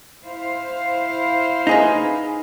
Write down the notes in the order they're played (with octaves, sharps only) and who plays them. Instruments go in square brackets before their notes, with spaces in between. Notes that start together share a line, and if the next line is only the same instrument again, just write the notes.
[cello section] E4 C5 F5
[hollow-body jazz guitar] D#4 G#4 B4